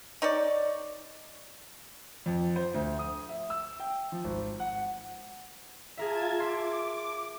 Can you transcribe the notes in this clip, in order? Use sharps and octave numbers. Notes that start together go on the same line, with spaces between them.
D#4 C#5 D5
F2
C5
D2
D#6
E5
E6
G5
F3
G#1
F#5
F4 G#4 A#4 E5 A5 G#6
E5 C6 D6